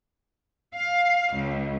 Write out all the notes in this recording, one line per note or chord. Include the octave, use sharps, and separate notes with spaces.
F5
C#2